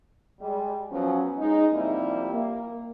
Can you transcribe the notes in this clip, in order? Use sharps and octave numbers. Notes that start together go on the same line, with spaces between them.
G3 G#3
F3 F#3 B3 C#4
G#3 D#4
C3 F3 G3 A#3 C4 E4
A#3